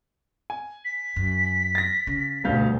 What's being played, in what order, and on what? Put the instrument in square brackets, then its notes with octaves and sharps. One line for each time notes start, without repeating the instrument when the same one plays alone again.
[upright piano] G#5
[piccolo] B6
[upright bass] F#2
[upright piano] A6 A#6
[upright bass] C#3
[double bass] D2 B2 [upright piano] G2 F5 G6